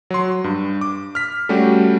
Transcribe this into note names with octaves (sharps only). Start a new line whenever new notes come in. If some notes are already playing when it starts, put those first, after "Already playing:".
F#3 C6
G2
D6
F6 B6
G3 A3 C#4 F#4 G4